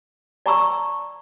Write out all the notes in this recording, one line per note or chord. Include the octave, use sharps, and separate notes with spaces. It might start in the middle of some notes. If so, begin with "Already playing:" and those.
D5 A5 A#5 C#6 E6